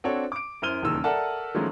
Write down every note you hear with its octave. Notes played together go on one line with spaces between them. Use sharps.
C4 D4 F#4 A4 C#5
D6 D7
F#2 E4 C5 F6 D#7 G7
D#1 E2 A#2 C#3 D#4 E6
A4 A#4 D5 E5 F#5 A5
D#3 F3 F#3 G#3 A3 C#4